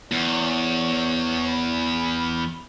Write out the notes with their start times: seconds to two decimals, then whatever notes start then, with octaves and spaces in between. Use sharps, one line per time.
0.12 E2 C#5
1.47 B5